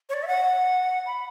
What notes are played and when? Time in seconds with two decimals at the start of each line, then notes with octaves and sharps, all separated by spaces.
0.09 C#5
0.14 D5
0.23 E5
0.27 F#5
1.06 B5